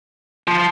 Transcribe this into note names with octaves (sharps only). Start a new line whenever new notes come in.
F3